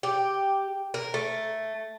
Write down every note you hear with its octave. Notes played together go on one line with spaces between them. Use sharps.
G4
A#4
A3